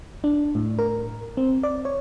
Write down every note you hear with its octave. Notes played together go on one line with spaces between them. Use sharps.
D4
A2
A#4
C4
D5
C#5